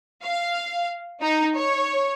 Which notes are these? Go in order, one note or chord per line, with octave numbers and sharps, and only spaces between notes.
F5
D#4 A#5
C#5